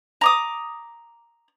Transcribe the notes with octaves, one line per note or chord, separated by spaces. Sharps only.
A#5 D6 D#6